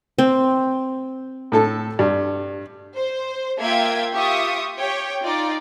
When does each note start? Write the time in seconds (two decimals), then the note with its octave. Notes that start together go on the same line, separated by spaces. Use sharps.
0.19 C4
1.52 A2 A4 A5
1.99 G2
2.95 C5
3.61 A#3 F4 E5 F5 G5 G#6
4.14 F4 G4 E5 C#6 D#6
4.78 G4 C#5 G5
5.21 D#4 F4 D5